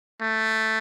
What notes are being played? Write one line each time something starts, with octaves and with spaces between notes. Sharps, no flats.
A3